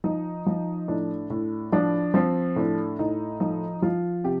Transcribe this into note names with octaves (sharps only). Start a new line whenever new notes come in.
F3 D#4
F3
A2 D4
A2
F3 D4
F3 C4
A2 D4
A2 D#4
F3 D#4
F3 F4
C3 G4